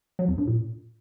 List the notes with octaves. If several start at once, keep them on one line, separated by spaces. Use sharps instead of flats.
F#3
F2
G2
A#2